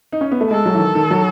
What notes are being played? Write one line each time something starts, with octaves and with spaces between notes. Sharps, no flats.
D#4
C#4
B3
A3
G#3 A4
F#3
E3
D#3
D#3
F#3